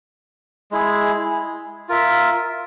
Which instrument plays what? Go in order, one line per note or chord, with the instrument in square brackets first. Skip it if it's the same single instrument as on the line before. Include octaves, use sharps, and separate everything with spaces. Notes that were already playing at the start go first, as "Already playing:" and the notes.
[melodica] G#3 E4 G#4
F4 A#4 E5